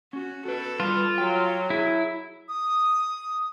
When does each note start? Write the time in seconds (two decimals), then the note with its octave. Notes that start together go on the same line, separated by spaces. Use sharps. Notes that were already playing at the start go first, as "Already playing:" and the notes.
0.13 C#4 F#4
0.45 F#4 A4 B4
0.80 G3 F4 B4
1.18 F#3 G5
1.70 E4 G#4
2.49 D#6